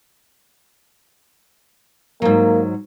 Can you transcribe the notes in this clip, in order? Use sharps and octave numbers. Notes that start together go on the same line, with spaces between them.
G#2 F#3 A#3